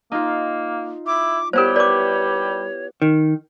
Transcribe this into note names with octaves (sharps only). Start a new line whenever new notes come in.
A#3 D#4 F4
E4 D6
G3 B3 E4 G4 A#4 C5 C#5
B4 D5 D6
D#3